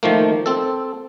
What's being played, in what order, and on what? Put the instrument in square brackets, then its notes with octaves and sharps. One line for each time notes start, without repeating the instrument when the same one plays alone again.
[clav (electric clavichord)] D#3 F3 A3 A#3
C4 A4